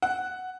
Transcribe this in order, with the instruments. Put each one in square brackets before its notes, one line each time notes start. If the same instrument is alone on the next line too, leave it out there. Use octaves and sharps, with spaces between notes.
[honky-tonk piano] F#5